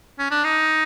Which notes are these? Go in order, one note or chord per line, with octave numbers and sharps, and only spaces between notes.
C#4
D4
D#4